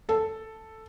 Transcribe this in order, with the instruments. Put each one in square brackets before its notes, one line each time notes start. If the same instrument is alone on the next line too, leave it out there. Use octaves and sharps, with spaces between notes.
[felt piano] A4